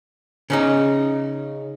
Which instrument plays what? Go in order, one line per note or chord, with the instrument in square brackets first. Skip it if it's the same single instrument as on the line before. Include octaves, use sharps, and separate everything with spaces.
[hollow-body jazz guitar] C#3 C#4 D#4